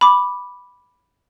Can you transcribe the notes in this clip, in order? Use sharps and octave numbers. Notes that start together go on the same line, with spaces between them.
B5 D6